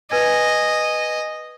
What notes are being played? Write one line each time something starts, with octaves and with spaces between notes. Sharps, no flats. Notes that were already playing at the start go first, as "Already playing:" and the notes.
B4 D#5 G#5 G#6